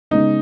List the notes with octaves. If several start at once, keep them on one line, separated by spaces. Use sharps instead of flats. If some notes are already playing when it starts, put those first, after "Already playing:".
C#3 G#3 B3 D#4